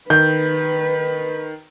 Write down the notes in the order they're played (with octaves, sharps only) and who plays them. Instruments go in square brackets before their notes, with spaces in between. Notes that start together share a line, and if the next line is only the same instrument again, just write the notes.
[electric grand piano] D#3 [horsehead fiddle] B4 [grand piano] G6